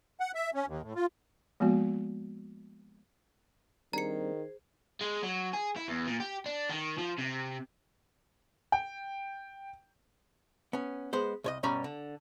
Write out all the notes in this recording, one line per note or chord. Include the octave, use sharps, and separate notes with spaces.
F#5
E5
C#4
D#2
A2
F4
F3 G#3 A#3 B3 F#4
D#3 G3 C4 D4 G#4 C5 A#5 C#7
G#3
F#3
G#4
E4
E2
A#2
G4
D4
D#3
F3
C3
G5
B3 C#4
G#3 B3 C5
C2 C#5 D#5
G2 B2 G3 C#4 A#5 B5
D3